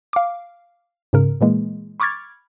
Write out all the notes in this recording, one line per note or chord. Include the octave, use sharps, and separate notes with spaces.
F5 D6
G#2 C#3 A#4
A#2 E3 G#3 A#3
B5 C#6 D6 F6 G#6 A6